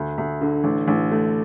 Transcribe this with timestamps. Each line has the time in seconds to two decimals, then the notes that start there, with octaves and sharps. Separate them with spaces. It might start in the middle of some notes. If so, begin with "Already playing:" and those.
Already playing: D2
0.18 D2
0.41 D3
0.64 A1
0.88 A1
1.11 A3